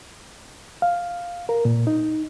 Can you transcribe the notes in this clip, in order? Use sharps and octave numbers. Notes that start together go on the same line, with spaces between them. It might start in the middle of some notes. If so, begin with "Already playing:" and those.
F5
A#4
A#2
D#4